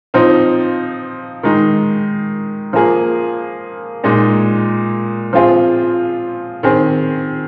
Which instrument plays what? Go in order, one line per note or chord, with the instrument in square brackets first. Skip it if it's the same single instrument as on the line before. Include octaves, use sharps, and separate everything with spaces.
[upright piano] F3 C4 D#4
D#3 G#3 D#4
F3 A#3 G#4
A#2 G#3 D#4
F3 C4 F4 G#4
D#3 C4 G#4